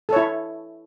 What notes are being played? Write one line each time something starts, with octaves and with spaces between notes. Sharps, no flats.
E4 A4 C#5